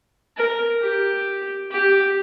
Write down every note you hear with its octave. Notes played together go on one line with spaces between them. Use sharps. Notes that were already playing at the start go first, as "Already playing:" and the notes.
A#4
G4
G4